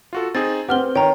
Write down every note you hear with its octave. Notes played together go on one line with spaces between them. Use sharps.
F4 F#4 A4
C4 D#4 G#4 A6
C4 G4 B4 F#5 F6 G7
D#3 C#5 G5 A#5